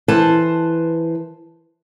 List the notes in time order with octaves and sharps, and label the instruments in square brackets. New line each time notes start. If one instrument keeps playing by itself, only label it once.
[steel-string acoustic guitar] E3 B4 C5 A5